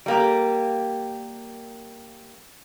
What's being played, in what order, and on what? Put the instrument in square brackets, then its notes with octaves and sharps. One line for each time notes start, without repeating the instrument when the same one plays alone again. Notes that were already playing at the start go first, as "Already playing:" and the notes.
[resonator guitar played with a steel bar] G3 A#3 G4